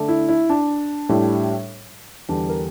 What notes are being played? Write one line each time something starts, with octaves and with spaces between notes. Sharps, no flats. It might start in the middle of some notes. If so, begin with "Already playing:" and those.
Already playing: D3 A3 D4
E4
E4
D4
A2 G3 D4
E2 D3 G3 D4
A#4